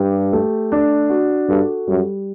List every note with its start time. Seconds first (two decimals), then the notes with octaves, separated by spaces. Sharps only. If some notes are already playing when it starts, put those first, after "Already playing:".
Already playing: G2 G4
0.33 A3
0.72 D4
1.10 F#4
1.49 G2 A4
1.87 F#2 G3